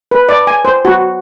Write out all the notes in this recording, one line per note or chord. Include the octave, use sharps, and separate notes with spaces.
B4
D5
G#5
C5
F#4